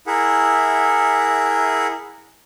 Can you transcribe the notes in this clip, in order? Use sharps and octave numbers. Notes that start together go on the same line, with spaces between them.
E4 G#4 A#4 E5 F#5